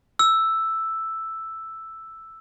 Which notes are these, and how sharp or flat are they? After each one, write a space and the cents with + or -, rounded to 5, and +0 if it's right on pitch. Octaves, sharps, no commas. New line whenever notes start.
E6 +0